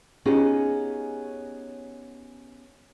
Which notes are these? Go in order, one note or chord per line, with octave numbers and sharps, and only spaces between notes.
B3 C#4 D#4 F4 G4 G#4